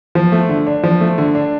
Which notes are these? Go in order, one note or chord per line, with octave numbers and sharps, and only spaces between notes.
F3
A3
D3
D4
F3
A3
D3
D4